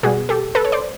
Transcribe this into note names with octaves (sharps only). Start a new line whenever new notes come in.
B2 G3 F#4 G#4
G4 A4
A4 B4
C#5
C5 D5